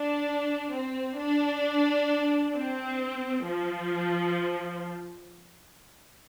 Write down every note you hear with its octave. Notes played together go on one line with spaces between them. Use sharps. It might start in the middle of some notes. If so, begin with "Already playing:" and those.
Already playing: D4
C4
D4
C4
F3